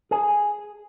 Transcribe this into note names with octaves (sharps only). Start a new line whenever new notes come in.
G#4